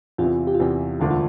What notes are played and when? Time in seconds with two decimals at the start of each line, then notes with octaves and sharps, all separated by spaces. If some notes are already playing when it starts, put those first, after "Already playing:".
0.18 E2 C3 E3 F4
0.47 G4
0.54 F4
0.60 E2 C3 E3 G4
1.00 E1 D2 D3 A3 D4 F4
1.10 F4